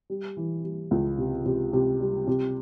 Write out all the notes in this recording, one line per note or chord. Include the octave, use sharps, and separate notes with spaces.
G3
E3
G3
C#2
C3
C3
C3
G3
C3